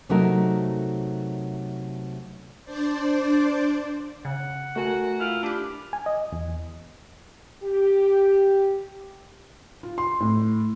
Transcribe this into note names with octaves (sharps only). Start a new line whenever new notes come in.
C3 F#3 A3 D#4 F#4 A#4
D4 C5 D5
C#3 F#5
A3 F#4 A#4 G#5
E4 F4 F6
D4 G4 B4
G#5
D#5
E2
G4
F4
C6
A2